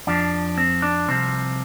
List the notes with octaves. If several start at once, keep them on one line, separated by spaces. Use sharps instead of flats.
F2 F3 D4
C4
D4
C2 C3 F3 C4